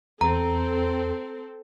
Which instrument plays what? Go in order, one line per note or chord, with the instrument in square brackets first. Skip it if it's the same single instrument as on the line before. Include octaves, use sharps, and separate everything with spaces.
[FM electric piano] E2 [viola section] C4 A4 [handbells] A#5